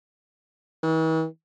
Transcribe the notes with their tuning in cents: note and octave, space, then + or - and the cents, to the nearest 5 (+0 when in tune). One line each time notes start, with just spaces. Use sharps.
E3 -45